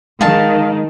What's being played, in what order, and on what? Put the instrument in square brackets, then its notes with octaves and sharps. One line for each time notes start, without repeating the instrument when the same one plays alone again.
[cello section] D#3 [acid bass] G#3 [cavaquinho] F5 A5